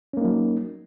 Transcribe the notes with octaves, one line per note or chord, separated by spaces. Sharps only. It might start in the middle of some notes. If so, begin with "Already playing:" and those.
F#3 A#3 C#4 D#4